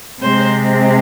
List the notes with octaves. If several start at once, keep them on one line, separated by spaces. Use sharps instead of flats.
C3 G#3 C4 C5